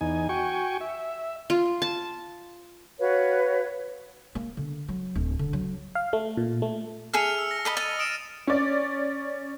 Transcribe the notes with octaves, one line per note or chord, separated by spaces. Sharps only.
E2 D#4 G#5
F#4 G5 G#5 C#6
E5
F4
A5
F#4 B4 C#5 F5
A#3
D3
F#3
D1
D3
F#3
F5
A3
A#2
A3
G#4 A4 E5 F6 C#7 F7
E6
A#6
A4 D#5 B5
D#5 A6 D#7
D#6 D7 E7
C#4 D5